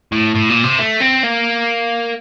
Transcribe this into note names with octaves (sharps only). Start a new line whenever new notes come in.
A2
A2
A#2
C3
A3
C4
A#3